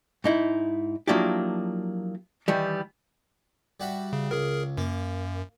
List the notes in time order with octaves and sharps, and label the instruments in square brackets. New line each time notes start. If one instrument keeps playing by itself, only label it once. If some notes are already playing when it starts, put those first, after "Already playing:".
[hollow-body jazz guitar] G#2 D#4 E4
F3 F#3 A#3 D4 E4 G4
D#3 E3 G3
[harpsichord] G3 F#4 E5
[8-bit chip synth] C#3
[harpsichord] C#2 [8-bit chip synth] G#4 A#4
[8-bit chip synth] F#2 [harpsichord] A#3